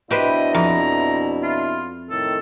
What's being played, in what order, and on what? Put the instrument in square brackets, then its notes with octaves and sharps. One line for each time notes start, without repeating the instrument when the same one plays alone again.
[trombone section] B2 D4 E4 [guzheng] G4 B4 C5 [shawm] D#5
[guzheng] F2 [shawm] A#5
[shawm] F4
[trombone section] A2 D#3 [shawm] A4